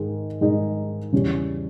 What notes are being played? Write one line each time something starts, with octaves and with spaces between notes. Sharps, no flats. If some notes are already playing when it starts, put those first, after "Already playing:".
Already playing: G#2 D#3 G#3
G#2 D#3 G#3 D#4
E2 C#3 E3 G3 C#4